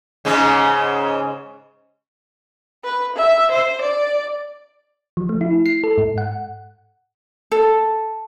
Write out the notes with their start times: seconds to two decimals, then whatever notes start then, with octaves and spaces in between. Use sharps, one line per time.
0.25 G#2 C#3 G#3
2.84 B4
3.16 E5
3.51 C5
3.81 D5
5.17 F3
5.29 A3
5.41 E4
5.66 C7
5.84 A4
5.98 G#2
6.18 F#5
7.52 A4